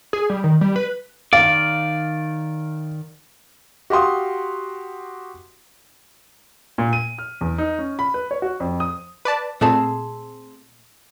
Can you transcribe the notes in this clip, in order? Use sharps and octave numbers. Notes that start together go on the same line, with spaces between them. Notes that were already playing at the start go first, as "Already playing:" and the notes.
G#4
G3
D#3
G3
B4
D#3 D5 F5
F#4 G4 F5 C6 D#6
A#2
D#7
F6
E2
D#4
C#4
B5
B4
C#5
F#4
F2
D#6
B4 D5 A5
A#2 A3 C4 G#4 A5